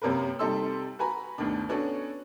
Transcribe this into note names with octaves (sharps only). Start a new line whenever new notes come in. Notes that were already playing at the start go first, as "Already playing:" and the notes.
F#2 C3 A#3 A#4 B4
C3 G3 D#4 A4 C6 E6
F#4 B4 G#5 A#5 B5
G1 D2 B2 D#3 D4
B3 C#4 D4 F#4 A4 C#5